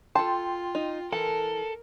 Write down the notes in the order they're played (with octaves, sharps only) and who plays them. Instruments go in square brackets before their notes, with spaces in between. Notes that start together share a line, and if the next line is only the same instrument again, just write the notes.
[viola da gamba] F4 [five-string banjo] A4 A5 [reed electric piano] G5 C6
[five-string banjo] D#4
[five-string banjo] E3 A5 [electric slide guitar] A4 [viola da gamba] A#4